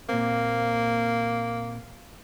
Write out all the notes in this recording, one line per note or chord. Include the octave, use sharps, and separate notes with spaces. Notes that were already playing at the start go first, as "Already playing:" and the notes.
A#2 A#3 C4